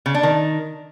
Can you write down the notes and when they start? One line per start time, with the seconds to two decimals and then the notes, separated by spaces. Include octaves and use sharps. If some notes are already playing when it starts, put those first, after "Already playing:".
0.06 C#3
0.15 D4
0.23 D#3